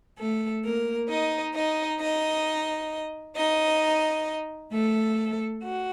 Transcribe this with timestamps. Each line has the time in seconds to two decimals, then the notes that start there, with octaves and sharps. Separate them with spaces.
0.18 A3 A4
0.64 A#3 A#4
1.09 D#4 D#5
1.54 D#4 D#5
1.99 D#4 D#5
3.35 D#4 D#5
4.72 A3 A4
5.63 F#4